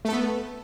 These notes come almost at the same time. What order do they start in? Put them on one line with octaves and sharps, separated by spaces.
A3 A4 B3